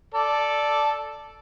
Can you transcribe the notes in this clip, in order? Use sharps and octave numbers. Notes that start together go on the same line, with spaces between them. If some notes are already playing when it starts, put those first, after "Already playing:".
A4 D5